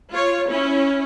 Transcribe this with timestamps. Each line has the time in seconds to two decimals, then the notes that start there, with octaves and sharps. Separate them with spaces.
0.12 F4 C#5
0.49 C#4 E4